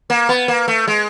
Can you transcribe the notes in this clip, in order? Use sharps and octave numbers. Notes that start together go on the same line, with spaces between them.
A#3
B3
A#3
A3
G#3